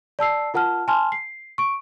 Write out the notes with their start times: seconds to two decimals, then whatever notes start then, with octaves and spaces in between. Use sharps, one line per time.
0.19 D5 A5 E6 C7
0.54 F4 A#4 F#5 A5 F6
0.88 G#5 A5 C6 F6
1.12 C7
1.58 C#6 D7